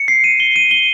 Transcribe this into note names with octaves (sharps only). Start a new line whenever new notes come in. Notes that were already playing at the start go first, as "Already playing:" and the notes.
Already playing: C#7
C7
D#7
G7
D#7
G7